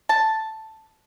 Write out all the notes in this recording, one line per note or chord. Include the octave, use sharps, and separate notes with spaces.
A5